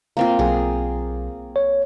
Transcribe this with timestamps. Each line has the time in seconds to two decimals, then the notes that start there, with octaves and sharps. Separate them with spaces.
0.17 A#3 C4 F4
0.39 B1 G#4
1.56 C#5